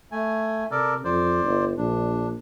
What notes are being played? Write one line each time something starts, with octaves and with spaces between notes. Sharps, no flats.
A3 G#5
C3 A4 A#4 D5
F2 C5 D5
G1
A#1 D4